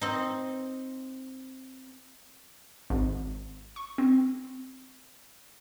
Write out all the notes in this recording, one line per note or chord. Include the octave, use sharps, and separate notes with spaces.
C4 D#4
G#1
C#6
C4